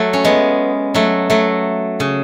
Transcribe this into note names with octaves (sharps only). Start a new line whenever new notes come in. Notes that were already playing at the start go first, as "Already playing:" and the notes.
Already playing: F#3 A3
C#4
G#3 B3
F#3 A3
F#3 A3
C#3